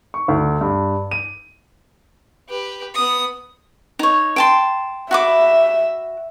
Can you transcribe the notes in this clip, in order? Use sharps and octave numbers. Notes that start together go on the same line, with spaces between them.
C#6
D2
G2
D#7
G4 B4
B3 D#6
D#4 C#5
G5 A5 C6
F#4 E5 B5 D6